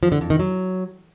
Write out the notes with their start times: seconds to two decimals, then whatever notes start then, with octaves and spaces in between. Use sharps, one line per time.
0.03 F3
0.12 D3
0.21 F2
0.30 D#3
0.39 F#3